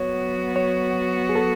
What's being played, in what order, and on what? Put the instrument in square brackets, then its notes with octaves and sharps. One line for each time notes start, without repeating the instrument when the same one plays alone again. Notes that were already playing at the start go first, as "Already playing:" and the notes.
Already playing: [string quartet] F#3 B3 F#4 [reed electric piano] C#5
[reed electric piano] C#5
G#4
A4